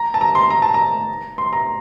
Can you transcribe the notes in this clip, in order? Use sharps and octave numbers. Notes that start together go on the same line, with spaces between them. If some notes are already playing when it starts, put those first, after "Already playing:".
Already playing: A#5
A5
A#5
C6
A#5
A5
A#5
C6
A#5